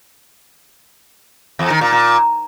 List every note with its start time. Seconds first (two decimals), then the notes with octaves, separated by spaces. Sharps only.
1.59 E2
1.70 D#3
1.81 A#2
1.92 A#2